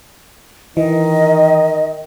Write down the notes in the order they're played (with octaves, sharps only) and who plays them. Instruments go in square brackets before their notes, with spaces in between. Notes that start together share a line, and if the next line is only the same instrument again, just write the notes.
[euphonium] D#3 [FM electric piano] E3 [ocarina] D#5